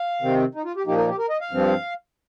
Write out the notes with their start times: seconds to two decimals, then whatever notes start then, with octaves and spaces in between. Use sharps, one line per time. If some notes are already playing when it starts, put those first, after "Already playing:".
Already playing: F5
0.21 C3 D#3 C4
0.55 D#4
0.65 F4
0.76 G4
0.86 A#2 F3 A#3 D#4 G4
0.98 A#4
1.09 G4
1.19 A#4
1.30 D#5
1.41 F5
1.51 G2 F3 C4